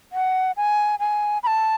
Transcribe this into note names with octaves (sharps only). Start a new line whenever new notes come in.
F#5
G#5
G#5
B5
A5